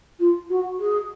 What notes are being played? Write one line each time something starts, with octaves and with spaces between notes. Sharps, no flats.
F4
F#4
G#4